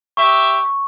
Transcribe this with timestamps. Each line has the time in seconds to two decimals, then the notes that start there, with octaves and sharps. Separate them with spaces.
0.17 G4 E5 C#6